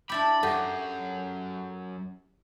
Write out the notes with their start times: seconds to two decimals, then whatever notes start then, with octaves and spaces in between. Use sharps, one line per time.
0.09 D4 E4 G4 B5 D6 A6
0.43 F#2 G4 A4 F#5 G6